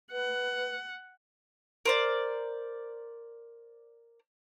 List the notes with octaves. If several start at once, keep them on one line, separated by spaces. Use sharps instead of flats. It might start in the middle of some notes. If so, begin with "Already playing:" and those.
B4 F#5
A#4 C5 D5